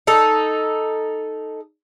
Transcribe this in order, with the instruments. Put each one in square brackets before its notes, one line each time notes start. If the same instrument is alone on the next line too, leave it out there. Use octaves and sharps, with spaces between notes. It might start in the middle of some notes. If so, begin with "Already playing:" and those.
[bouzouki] D#4 A4